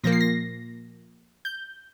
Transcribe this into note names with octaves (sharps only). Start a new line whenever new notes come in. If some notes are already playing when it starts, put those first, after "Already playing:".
A#2 F3 A#3 A#6
C7
A#6
G6